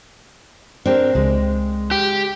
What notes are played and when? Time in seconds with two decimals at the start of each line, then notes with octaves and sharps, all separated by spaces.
0.86 C4 D4 G4 A#4
1.15 C#2 G#3
1.91 G4